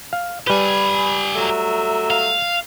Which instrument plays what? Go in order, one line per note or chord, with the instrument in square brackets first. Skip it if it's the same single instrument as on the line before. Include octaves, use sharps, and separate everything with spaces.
[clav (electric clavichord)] F5
[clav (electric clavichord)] G3 B4 [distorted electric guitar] G4 G#5 [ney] B5
[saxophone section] F#3 A3 E5 [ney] A#5
[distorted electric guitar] F5